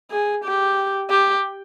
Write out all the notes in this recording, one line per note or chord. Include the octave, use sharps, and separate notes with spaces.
G#4
G4
G4